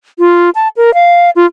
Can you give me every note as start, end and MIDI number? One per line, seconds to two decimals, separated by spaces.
0.19 0.50 65
0.55 0.68 81
0.77 0.94 70
0.94 1.30 77
1.36 1.46 65